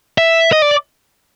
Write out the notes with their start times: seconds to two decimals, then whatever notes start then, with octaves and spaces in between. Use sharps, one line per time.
0.18 E5
0.53 D#5
0.62 D5